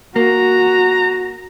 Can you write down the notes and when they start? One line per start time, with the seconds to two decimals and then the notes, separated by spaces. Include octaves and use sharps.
0.16 A#3 F#4 A#5